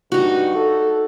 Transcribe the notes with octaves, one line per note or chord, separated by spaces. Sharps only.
G2 D#4 F#4
A4